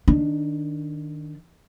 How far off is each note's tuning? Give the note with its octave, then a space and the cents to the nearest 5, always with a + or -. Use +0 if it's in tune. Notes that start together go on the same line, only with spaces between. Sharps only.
D#3 -15 D4 -5